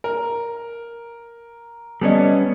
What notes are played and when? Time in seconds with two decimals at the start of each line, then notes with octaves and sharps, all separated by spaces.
0.04 A#4
2.01 G3 B3 C#4 A4 D5 D#5